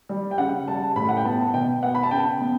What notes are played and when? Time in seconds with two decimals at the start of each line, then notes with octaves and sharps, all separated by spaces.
0.09 G3
0.31 G5
0.38 C#3 F#5
0.68 G3 A5
0.96 A2 B5
1.09 F#5
1.17 G5
1.25 B3 A5
1.54 B2 G5
1.83 B3 F#5
1.95 B5
2.03 A5
2.11 C#3 G5
2.41 B3